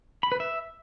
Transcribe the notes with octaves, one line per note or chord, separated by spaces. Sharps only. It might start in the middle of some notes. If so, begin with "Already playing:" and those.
B5
B4
E5